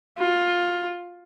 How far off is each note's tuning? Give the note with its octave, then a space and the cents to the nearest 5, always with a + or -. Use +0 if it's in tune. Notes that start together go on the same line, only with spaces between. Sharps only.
F4 +10